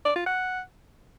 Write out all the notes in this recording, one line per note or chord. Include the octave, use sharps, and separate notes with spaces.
D5
F4
F#5